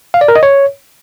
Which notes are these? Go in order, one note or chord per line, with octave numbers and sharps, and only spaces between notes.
F5
D5
A#4
D#5
C#5